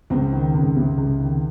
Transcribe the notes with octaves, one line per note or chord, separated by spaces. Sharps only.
C#2 C4
D#3
C#2
C3
C#2
D#3